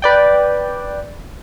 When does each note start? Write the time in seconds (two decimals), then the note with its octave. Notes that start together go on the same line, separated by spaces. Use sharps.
0.02 B4 D5 G5